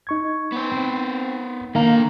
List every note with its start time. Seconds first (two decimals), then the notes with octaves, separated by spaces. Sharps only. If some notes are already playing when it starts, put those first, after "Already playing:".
0.07 D#4 C#6 G#6
0.52 B3 C5
0.72 C4
1.75 D3 D#3 A#3 F5 A#5